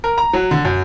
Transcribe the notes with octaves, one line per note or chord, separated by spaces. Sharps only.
A#4
A#5
F#3
D3
F#2